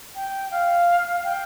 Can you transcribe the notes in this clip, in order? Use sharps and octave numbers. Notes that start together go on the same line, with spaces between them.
G5
F5
G5